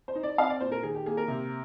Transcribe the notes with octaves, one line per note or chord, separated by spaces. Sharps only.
C5
D#4
D5
C4 F5
D5
A#2 C5
A#4
D#3 G#4
G4
A#3 G#4
A#4
C3